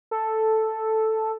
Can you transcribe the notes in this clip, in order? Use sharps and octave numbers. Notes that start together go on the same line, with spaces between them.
A4